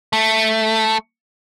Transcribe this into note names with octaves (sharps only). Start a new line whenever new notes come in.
A3